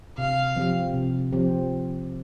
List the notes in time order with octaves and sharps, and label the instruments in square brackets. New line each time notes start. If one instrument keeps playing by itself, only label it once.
[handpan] C3 [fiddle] F5
[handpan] F3 C4 G4
C3
F3 C4 G4